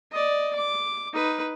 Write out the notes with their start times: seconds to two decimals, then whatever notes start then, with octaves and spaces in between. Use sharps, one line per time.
0.12 D5 D#5
0.56 D6
1.13 D#4 B4